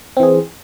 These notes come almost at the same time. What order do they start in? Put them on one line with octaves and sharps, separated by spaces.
C4 E3 G#4